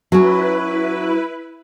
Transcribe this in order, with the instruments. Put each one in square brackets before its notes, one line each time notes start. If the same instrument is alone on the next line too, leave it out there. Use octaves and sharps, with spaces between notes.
[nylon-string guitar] F#3 C#4 [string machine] E4 B4